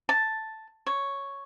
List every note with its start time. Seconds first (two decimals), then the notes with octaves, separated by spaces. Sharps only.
0.09 A5
0.87 C#5